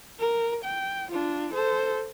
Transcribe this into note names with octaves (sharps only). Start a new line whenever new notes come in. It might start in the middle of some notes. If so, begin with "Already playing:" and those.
A#4
G5
D4 F4
A4 C5